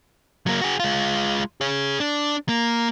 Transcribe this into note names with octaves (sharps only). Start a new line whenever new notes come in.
F#3 A#3
F#4 G#4
G#3 F4
G#4 C#5
D4
A#3